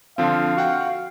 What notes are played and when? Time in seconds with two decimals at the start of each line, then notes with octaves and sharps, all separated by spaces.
0.18 D3 F3 C4 F5
0.57 F#4 F#5 G5